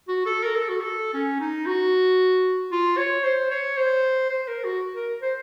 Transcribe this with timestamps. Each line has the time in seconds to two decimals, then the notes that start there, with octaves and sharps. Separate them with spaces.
0.08 F#4
0.26 A4
0.43 A#4
0.55 A4
0.68 F#4
0.81 A4
1.13 C#4
1.40 D#4
1.66 F#4
2.72 F4
2.97 C#5
3.24 C5
3.51 C#5
3.77 C5
4.29 C5
4.47 A#4
4.64 F#4
4.96 A#4
5.22 C5